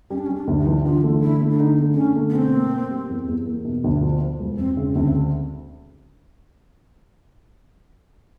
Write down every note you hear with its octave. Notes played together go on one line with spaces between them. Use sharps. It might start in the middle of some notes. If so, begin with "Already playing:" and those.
G3 C#4
D4
C#4
G3
D4
D2
D#4
E3
D3 F4
A3
D3 E4
A3
D4
D3 D#4
A3
C4
D3 C#4
A3
B3
B2 C4
A#3
A#3
G3
E2
E2
A#3
B2
D2
F3
F3
E1
E1 C4
C#3
D2 C4